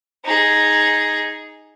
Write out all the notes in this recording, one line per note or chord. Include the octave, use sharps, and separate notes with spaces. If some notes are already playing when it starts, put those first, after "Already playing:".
D#4 G#4